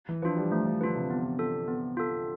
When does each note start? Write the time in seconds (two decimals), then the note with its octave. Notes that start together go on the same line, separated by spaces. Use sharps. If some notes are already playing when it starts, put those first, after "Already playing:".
0.09 E3
0.22 F3 D4 F4 B4
0.37 G3
0.51 F3 A3
0.66 F3
0.81 D3 D4 F4 B4
0.96 C3
1.10 B3
1.39 F4 A4
1.68 B3
1.97 F4 A4